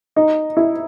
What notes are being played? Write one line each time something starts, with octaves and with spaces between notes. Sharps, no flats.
D#4
E4